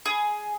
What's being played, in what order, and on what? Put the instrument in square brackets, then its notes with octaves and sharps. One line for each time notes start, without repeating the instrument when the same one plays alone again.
[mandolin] G#4